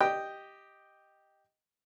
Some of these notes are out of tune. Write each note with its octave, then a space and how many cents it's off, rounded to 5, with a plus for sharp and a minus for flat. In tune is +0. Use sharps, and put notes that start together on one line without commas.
G4 +0 D#5 +0 G5 +0